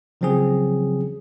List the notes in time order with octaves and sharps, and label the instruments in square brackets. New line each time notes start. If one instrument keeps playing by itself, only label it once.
[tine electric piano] C#3 F3 F#3 C4 C#4 G#4